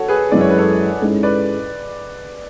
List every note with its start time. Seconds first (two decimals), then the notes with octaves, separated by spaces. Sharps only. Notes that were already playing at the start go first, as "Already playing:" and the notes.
Already playing: F#4 A4 C#5
0.08 G#4 B4
0.32 F#2 E3 G#3 D5
0.41 C#5
0.50 B4
0.58 A4 C#5
1.00 G#2 G#3 C#4 E4 A4
1.23 B4 D5